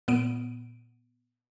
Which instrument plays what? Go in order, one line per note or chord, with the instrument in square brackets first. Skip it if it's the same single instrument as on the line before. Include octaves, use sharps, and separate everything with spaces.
[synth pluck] A#2 B3 D7 D#7